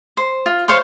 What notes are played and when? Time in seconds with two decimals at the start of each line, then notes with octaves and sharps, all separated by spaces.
0.17 C5
0.46 F4
0.68 C5 C#5 F5 C6